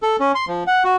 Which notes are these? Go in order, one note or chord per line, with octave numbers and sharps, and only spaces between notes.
A4
C#4
C6
F3
F#5
F#4